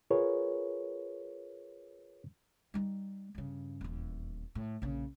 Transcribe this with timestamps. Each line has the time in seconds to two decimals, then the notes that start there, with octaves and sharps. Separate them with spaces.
0.11 F4 G#4 A#4 B4 C#5
2.74 G3 D#4
3.35 G2 C#3
3.81 D#1 E2
4.55 A2
4.82 A#1 C#3